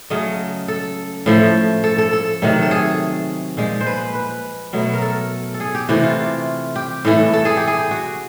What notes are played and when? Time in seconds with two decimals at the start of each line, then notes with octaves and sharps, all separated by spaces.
0.10 C#3 F#3 A3 D#5
0.68 A4
1.26 A2 F3 A3
1.84 A4
1.98 A4
2.13 A4
2.42 C3 D#3 F#3 A3
2.63 A4
2.71 G#4
3.57 A#2 F3 G#3
3.81 C5
3.87 B4
4.15 B4
4.73 B2 F#3 A3
4.93 A#4
5.02 A4
5.54 A4
5.60 G#4
5.75 G4
5.89 C3 E3 A3 F#4
6.03 F4
6.76 G4
7.05 A2 E3 A3
7.33 A4
7.45 G#4
7.57 G4
7.68 G#4
7.91 F#4